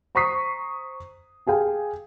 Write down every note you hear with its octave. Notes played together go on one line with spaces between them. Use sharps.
C5 A#5 C#6 D#6 B6 C7
G4 G#4 F5 G5 G#5